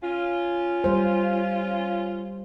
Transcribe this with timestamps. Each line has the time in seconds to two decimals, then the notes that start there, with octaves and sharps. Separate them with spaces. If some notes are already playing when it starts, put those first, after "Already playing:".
0.02 C#4 F4
0.84 G3 C5